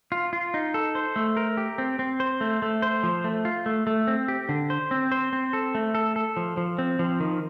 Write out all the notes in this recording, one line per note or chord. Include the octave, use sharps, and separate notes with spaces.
F4
F4
D#4
A4
C5
A3
A#4
G4
C4
C4
C5
A3
A3
C5
F3
A3
F4
A3
A3
C4
G4
D3
C5
C4
C5
C4
A4
A3
A4
A4
F3
F3
C4
F3
D#3